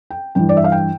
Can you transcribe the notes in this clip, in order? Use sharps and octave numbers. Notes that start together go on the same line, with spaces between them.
G5
G2 E3 G5
D5
E5
F5
G5